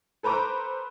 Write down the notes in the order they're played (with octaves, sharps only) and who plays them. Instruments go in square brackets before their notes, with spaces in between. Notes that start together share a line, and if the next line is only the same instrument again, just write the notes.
[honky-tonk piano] A4 B4 C5 A#5 D6